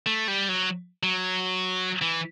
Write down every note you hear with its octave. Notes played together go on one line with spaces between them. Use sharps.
A3
G3
F#3
F#3
E3